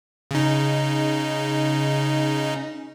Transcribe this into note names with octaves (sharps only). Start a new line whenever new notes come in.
C#3 D#4